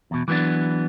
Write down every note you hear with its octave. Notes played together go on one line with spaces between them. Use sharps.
E2 B2
E3 F#3 A#3 B3 D4